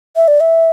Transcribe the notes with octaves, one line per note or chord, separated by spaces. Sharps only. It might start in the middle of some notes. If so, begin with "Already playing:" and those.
E5
D5
E5